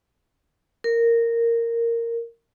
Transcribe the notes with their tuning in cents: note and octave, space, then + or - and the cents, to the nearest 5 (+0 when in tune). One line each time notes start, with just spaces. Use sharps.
A#4 -10